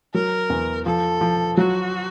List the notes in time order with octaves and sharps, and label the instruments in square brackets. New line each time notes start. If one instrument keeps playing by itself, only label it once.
[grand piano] F#3 [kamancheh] A#4
[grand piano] E2
[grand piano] F3 [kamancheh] A4
[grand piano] F3
[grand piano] F#3 [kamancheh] F#4